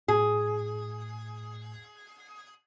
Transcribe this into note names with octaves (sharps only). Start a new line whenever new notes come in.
A2 G#4